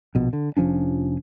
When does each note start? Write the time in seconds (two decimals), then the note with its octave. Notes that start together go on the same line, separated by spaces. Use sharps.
0.15 A#1 B2
0.33 D3
0.57 F1 F3 C#4 D4